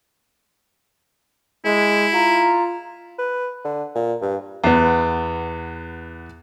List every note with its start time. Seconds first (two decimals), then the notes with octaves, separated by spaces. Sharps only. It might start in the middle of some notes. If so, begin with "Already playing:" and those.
1.65 G#3 E4
2.14 F4 A#5
3.18 B4
3.65 D3
3.95 A#2
4.22 G2
4.64 E2 B3